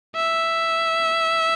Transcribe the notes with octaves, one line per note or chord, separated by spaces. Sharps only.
E5